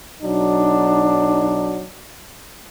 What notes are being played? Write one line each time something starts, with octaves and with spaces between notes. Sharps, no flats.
B1 F#3 D4 D#4